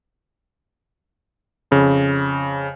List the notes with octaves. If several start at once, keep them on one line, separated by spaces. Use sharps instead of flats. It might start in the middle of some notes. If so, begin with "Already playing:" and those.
F2 C#3